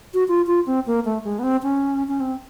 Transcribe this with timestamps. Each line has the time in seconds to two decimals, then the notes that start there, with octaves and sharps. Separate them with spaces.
0.14 F#4
0.28 F4
0.47 F4
0.66 C4
0.87 A#3
1.05 A3
1.24 G#3
1.39 B3
1.43 C4
1.63 C#4
2.08 C#4
2.20 C4